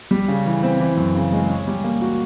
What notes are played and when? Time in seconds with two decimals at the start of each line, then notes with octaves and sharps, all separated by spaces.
0.11 G3
0.28 C#3
0.46 E3
0.63 C4
0.80 E3
0.97 F#2
1.15 C#3
1.32 G#3
1.49 C#4
1.67 G3
1.84 A#3
2.01 F#4